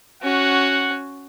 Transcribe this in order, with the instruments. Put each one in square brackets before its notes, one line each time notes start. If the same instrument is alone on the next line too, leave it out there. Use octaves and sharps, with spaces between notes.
[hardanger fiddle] C#4 F#4 [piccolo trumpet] F#5